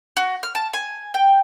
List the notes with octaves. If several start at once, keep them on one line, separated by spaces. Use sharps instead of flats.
F#4
F6
A5
G#5
G5